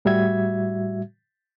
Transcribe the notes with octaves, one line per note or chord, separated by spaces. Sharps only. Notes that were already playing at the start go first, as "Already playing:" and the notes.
A2 G3 F#4 E5 G#6